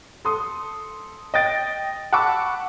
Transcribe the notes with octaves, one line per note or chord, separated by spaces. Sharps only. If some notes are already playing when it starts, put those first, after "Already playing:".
A4 C6 D#6
D#5 G5 A6 D7
F#5 A5 B5 C#6 D6 E6